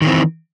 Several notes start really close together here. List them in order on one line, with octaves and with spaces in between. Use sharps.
D#3 E3 C4